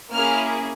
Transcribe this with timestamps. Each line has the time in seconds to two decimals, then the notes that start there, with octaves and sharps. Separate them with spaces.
0.12 A#3 C#4 E4 G#4 F6